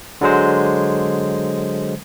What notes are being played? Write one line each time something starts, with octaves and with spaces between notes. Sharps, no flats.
D3 F#3 G#3 C5